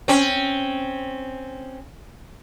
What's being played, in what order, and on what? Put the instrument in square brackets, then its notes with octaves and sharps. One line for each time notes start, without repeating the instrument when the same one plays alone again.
[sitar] C4 C#4